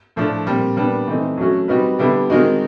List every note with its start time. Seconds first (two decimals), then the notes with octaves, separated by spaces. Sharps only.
0.16 A2 F3 A3 D4
0.46 A#2 G3 C4
0.77 A#2 G3 B3 D4
1.07 E3 A3 C4 D#4
1.37 F#3 A3 C#4 F#4
1.68 G3 C4 D#4 F#4 B4
1.99 D3 G3 B3 E4 G4
2.30 D#3 G#3 C4 D#4 F#4